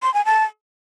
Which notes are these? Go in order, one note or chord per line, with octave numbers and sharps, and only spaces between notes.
C6
G#5
A5